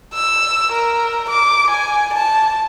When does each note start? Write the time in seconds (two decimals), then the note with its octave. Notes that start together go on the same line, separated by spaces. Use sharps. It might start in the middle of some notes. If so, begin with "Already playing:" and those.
0.14 E6
0.73 A#4
1.30 D6
1.71 G#5
2.14 A5